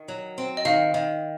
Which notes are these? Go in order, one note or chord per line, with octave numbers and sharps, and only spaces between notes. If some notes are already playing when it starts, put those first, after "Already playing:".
Already playing: D#3
F#3
C4
D#5
D#3 F5
D#3